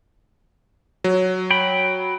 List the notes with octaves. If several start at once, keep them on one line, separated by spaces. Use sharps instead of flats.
F#3
G5 B5